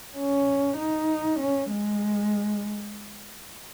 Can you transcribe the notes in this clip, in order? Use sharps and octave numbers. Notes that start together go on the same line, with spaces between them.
C#4
D#4
C#4
G#3